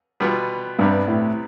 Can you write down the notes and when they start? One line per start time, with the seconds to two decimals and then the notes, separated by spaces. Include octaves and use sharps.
0.20 B2 G3 B3 F4
0.79 C2 G2 C3 G3 B3
1.08 A2